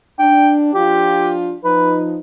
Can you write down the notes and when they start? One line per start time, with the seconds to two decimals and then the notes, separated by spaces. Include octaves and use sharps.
0.19 D4 G5
0.74 F3 D4 F4 G4
1.65 F3 D#4 B4